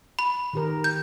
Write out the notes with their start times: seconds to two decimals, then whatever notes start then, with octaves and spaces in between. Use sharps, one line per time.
0.19 B5
0.53 D#3 G4 A#4
0.84 G6